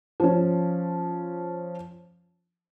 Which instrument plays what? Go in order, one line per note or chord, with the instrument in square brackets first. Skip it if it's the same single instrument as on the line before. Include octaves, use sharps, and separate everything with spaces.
[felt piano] F3 C#4